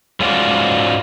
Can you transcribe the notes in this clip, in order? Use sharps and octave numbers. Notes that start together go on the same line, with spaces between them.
G#2 G#3 C#4 F4 F#4 D5